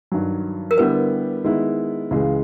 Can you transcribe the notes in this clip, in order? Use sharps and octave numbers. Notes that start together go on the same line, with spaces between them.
G2 D#3 F#3
A#4
D3 G3 B3 E4 G4 B4
D#3 G#3 B3 E4
C#2 C#3 E3 G#3